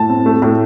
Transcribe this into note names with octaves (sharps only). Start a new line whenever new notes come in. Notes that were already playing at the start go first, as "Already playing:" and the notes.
Already playing: A2 A5
C4
A3
A2